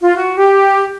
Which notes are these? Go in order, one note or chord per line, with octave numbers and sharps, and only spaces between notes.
F4
F#4
G4